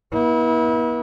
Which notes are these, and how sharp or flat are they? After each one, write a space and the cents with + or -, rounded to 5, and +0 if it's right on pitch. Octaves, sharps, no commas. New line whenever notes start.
B3 -45 E4 -30